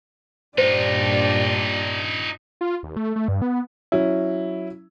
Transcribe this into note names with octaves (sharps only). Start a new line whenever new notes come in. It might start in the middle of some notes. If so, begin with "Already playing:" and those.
G2 A#2 D4 D#4 F4 G4 C5 D5
F4
D#2
A3
A3
G2
B3
F#3 C#4 E4